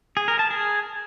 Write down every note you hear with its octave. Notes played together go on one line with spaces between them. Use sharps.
G#4
A#4
A5
G#4